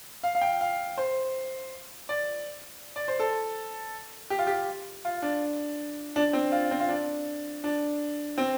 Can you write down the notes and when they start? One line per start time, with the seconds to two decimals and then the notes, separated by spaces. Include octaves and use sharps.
0.23 F5
0.35 F5
0.41 G5
0.61 F5
0.98 C5
2.09 D5
2.96 D5
3.08 C5
3.19 A4
4.30 G4
4.39 F4
4.47 G4
5.05 F4
5.22 D4
6.16 D4
6.33 C4
6.52 F4
6.71 C4
6.80 F4
6.89 D4
7.64 D4
8.38 C4